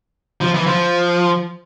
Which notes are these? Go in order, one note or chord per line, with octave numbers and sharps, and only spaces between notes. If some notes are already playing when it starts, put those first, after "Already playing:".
F3
E3
F3